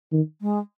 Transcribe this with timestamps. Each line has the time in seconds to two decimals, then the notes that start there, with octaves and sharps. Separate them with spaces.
0.12 D#3
0.41 G#3